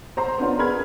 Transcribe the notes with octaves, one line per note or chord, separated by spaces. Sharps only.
C5 A#5 C6
B3 C#4 D4 F4
G#4 A#4 B4 B5 F6 G#6